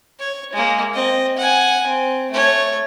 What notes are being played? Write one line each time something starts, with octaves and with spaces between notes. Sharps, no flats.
C#5
G#3 A#3
C4 D#5
F#5 G#5
C4
A3 C#5